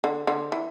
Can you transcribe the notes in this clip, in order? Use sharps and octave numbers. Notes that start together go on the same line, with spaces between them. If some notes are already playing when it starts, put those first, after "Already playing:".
D3
D3
E3